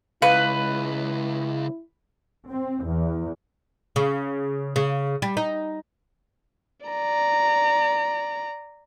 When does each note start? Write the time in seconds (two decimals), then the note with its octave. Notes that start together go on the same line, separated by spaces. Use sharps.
0.22 C#2 E4 B4 F5
2.49 C4
2.86 E2
3.96 C#3
4.76 C#3
5.22 G3
5.37 D#4
6.86 D5 A#5